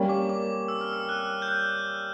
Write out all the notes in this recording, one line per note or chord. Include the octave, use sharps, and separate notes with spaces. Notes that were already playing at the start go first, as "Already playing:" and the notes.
Already playing: G3 A#3 C#4
D6
D6
E6
F6
E6
F#6
G6
F#6